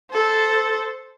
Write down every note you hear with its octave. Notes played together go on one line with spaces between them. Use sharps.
A4 C5